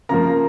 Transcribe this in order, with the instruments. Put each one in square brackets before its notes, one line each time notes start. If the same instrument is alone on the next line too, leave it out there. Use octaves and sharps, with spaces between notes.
[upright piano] C#3 F3 A#3 A#4 A#5